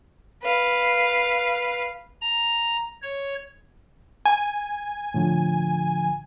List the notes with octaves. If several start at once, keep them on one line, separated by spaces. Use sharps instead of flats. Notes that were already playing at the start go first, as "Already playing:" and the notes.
B4 F5
A#5
C#5
G#5
A2 D3 F3